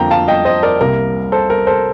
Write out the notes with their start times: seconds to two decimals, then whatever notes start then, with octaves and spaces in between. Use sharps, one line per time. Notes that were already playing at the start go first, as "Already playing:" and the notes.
Already playing: F2 D3 F3 A#3 G5 A#5
0.10 F5 A5
0.28 D#5 G5
0.45 C5 D#5
0.63 A#4 D5
0.81 C2 C3 G3 A#3 A#4
1.32 A4 C5
1.50 A#4
1.67 A4 C5